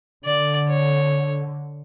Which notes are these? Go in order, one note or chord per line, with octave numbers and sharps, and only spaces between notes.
D3 D5
C#5